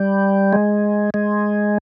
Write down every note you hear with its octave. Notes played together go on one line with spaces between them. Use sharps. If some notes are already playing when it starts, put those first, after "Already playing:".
Already playing: G3
G#3
G#3